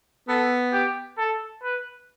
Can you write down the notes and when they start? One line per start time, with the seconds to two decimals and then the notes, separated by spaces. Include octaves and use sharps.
0.28 B3 A4
0.73 G4
1.18 A4
1.63 B4